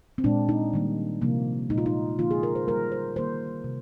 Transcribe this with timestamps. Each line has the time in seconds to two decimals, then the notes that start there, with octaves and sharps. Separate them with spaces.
0.18 C4
0.24 A#2 G#3 D4
0.49 D#4
0.73 D#3 G3 A#3
1.21 C3 F3 A#3
1.70 A#2 G#3 D#4
1.78 F4
1.86 D#4
2.19 D3 F3 A#3 F4
2.31 G#4
2.43 A#4
2.55 C5
2.67 D#3 G3 A#3 A#4
2.92 C5
3.16 D#3 G3 A#3 C5
3.64 C3